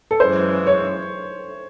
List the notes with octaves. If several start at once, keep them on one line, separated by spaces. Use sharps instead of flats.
A4
F#2 C#3 E3 G#3 C5
C#5